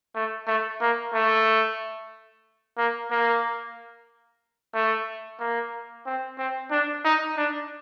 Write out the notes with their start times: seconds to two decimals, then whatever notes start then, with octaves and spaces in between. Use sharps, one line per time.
0.15 A3
0.47 A3
0.81 A#3
1.14 A3
2.78 A#3
3.11 A#3
4.74 A3
5.40 A#3
6.06 C4
6.38 C4
6.71 D4
7.05 D#4
7.37 D4